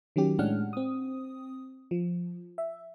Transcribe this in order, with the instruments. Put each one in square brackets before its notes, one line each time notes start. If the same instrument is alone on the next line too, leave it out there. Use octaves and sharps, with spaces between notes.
[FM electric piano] D#3 F#3 C#4 G4
A2 G#3 C#4 D4 F#5 F6
C4 D#6
F3
E5